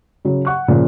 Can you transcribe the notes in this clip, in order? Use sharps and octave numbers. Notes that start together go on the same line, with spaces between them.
C#3 F#3
F#5 C#6 F#6
A#2 C#3 F3